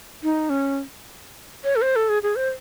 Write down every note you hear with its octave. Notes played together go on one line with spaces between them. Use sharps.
D#4
C#4
C#5
A4
C5
A4
G#4
G#4
C5